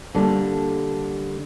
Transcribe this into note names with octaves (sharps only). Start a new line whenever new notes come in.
D3 G3 A#3 D4